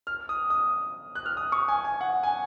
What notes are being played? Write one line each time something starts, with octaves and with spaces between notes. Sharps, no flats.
F6
D#6
D#6
F#6
F6
D#6
C#6
G#5
G#5
F#5
G#5